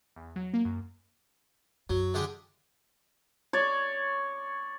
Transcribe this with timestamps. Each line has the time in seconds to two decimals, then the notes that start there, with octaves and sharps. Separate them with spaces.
0.16 E2
0.36 F#3
0.54 A#3
0.65 F#2
1.90 F#2 F#3
2.14 D3 G#3 G4
3.53 C#5 D5